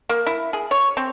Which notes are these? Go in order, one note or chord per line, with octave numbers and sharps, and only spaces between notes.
A#3
E4
G#4
C#5
C4